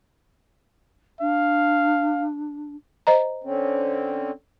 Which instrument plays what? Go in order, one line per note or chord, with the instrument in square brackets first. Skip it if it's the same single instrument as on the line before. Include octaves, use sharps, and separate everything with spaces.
[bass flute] D4 [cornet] F5
[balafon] C5 D#5 A#5
[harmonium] D3 C4 C#4